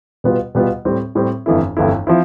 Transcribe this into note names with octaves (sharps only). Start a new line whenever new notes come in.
B2 G3 B3 F4
B2 G3 B3 F4
A2 G3 C4
A2 G3 C4
G1 F2 E3 A3 E4
G1 F2 E3 A3 E4
F3 C4 E4